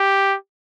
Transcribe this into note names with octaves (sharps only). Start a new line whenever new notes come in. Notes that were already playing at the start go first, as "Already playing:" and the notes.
Already playing: G4